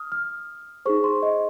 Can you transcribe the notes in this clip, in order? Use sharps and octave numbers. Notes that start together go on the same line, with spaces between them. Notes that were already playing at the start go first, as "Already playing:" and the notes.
Already playing: D#6 F6
F6
D#4 G#4 C5 C#6
C6
D#5